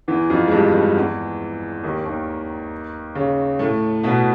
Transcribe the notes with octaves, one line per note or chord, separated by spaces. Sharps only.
E2 E3
F2 F3
G#3
G2 G3
G2 G3
E2 E3
D#2 D#3
D#2 D#3
C#3
A2 A3
B2 B3